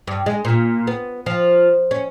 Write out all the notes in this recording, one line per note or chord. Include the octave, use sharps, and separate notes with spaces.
G2
G#3
A#2
B3
F3
C#4